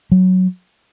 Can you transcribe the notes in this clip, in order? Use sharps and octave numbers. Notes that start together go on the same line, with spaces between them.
F#3